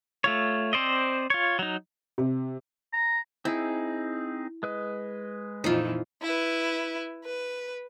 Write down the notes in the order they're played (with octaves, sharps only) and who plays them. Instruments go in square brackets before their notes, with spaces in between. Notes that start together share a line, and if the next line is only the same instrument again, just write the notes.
[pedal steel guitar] A3 F4 C#5
C4 C5 D5 D#5
F4 C#5
F#3 D#4
[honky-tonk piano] C3
[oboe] A#5
[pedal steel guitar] C4 D#4 G#4 [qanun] E4
[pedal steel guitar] G#3 B4 D#5
[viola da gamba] F2 A#2 E3 [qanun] D#4 F4
[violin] E4 B4
B4